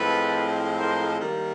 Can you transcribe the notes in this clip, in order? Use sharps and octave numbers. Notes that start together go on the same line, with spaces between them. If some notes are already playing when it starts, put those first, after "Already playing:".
Already playing: A2 F3 G#3 C4 A4 B4
A#4 C5
D#3 G3 A#3